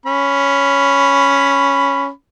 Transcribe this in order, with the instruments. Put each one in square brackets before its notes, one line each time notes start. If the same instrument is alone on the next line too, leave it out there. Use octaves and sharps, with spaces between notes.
[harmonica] C#4 B5